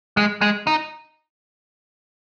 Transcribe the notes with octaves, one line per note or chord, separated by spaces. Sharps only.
G#3
G#3
D#4